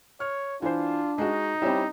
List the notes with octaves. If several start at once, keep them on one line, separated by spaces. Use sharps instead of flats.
C#5 F6
E3 D4 F4 C5
G#3 D#4 F#4
G3 C4 C#4 E4